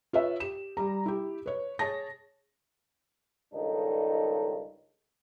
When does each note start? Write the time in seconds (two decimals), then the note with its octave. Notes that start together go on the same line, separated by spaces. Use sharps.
0.13 F4 B4 C#5 E5
0.40 G4 E7
0.77 G3 A#5
1.06 E4 G4
1.46 B4 C#5
1.79 G#4 C#5 A5 A#6
3.54 C#2 G2 D#3 D4 D#4 A4